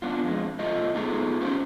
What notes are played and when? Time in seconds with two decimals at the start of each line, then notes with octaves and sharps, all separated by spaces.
0.02 B3 D4 F4
0.24 F2 G#3
0.59 B2 A3 F4 D#5
0.95 B3 D#4 F4 G#4 A4
1.41 C#4 F4 G4 C5